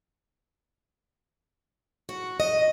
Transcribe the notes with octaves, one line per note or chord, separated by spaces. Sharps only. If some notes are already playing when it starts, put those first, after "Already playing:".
F#4
D#5